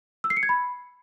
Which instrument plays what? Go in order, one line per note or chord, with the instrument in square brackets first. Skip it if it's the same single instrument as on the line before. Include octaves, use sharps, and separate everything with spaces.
[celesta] E6
C7
C#7
G#6
B5